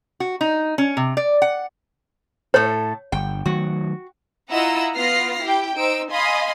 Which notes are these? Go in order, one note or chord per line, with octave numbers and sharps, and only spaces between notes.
F#4
D#4
C#4
C3
D5
F#5
A2 A4 C#5
G1 G5
D#3 F#3 A3 F#4
E4 F4 D#5 F#5 A#5 E6
B3 F4 F6 A#6 C7
E4 G4 G5
D#4 C5 E6 D7
D#5 F5 G#5 B5 C6 D#6